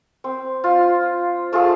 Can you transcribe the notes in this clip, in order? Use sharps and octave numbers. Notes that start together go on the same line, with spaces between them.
C4
F4
A3 F4 G#4 A4